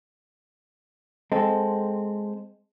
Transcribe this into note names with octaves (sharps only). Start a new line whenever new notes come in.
G#3 C4 A4